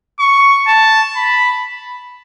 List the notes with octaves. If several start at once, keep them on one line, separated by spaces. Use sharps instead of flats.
C#6
A5
B5